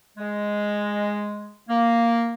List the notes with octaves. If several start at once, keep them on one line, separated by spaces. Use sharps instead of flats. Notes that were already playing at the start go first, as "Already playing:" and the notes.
G#3
A#3